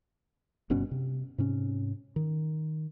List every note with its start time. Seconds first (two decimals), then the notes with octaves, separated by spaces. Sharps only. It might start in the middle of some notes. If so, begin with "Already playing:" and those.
0.70 F#1 G2 B2 C#4
0.91 C3
1.38 G#2 C3 C#4
2.16 D#3